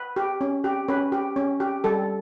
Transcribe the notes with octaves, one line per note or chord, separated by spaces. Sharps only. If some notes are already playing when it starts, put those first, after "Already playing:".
Already playing: B4
G4
C#4
G4
C#4 B4
G4
C#4
G4
G3 A4